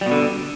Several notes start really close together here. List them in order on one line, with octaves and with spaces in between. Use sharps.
G3 B2 D3